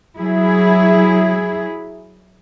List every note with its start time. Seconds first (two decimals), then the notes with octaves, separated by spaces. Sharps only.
0.19 F#3 E4 G#4